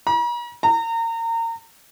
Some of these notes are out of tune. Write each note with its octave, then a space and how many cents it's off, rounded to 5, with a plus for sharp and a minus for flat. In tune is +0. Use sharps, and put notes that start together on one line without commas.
A#5 +45
A#5 -30